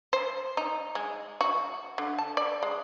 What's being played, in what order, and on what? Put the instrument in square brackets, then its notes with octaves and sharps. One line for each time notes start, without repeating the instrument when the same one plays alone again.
[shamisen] C5
D#4
G#3
F#4
D3
A5
D5
G#3